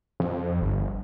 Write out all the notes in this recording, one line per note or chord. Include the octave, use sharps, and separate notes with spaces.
F2
G1